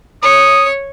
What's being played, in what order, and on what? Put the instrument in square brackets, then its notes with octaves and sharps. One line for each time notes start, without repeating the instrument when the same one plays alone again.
[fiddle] C#5 [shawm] D#6